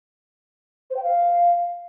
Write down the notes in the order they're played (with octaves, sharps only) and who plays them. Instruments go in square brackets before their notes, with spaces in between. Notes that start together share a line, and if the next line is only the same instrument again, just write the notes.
[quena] C5
G5
F5